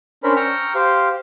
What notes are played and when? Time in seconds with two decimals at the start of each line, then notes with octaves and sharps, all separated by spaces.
0.23 C#4 D4 A#4 C5 B5
0.36 G5 A#5 C#6 E6 F6
0.75 G4 C5 F5